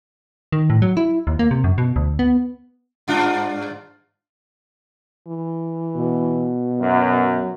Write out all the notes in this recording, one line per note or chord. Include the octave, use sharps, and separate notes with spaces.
D#3
A2
F#3
E4
D#2
A#3
C3
F#2
B2
D2
B3
G2 D4 F4
E3
B2
F#2 F#3